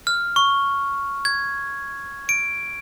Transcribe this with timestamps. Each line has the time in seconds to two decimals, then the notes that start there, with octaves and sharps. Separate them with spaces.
0.07 F6
0.36 C#6
1.25 G#6
2.29 D7